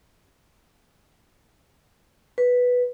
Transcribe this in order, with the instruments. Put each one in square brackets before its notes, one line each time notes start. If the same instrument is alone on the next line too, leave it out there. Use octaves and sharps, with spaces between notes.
[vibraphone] B4